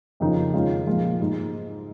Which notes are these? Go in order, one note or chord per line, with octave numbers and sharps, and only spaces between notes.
F2 C#3 F3 A#3 D#4
F2 D#3 G#3 C#4 F4
A#2 F3 G#3 F4
G#2 G#3 D#4